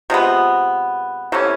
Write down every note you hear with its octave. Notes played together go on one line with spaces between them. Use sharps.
C3 F3 G#3 B3
C3 E3 A3 C#4